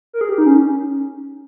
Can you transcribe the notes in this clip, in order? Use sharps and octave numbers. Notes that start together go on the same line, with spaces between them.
A#4
G#4
G4
D#4
C#4